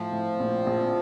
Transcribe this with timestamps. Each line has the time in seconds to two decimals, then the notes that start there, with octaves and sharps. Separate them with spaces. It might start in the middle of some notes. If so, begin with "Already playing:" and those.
Already playing: A2 F3
0.12 A2
0.40 A#1
0.66 A#1